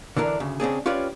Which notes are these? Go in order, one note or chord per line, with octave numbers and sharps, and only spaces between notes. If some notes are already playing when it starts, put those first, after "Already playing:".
D3 E3 D4 A#4
D2 C#3
C#3 C4 D4 G#4
C#4 F4 G4 B4 C#5 D5